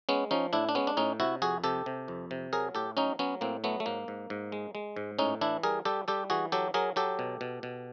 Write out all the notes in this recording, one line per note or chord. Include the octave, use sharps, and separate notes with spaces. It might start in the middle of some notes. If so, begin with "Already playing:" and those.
G#3 B3 C#4
F3 C#4 D#4
A2 D4 E4
D4
G#3 B3 C#4
D4
A2 C#4 D#4
C3 E4 F#4
F2 F#4 G#4
C3 G4 A4
C3
F2
C3
F#3 G#4 A#4
A2 G4 A4
F#3 C#4 D#4
F#3 B3 C#4
A2 A#3 C4
F#3 A3 B3
A3
G#2 A#3
G#2
G#2
G#3
G#3
G#2
A2 C#4 D#4
E3 D4 E4
G3 G#4 A#4
G3 G4 A4
G3 G4 A4
E3 F#4 G#4
F#3 G4 A4
F#3 G#4 A#4
F#3 G4 A4
B2
B2
B2